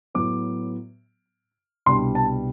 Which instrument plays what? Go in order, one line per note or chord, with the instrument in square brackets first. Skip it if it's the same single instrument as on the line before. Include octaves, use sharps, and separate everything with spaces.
[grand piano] A2 F#3 B3 D6
C2 B2 G3 B3 D4 C6
A5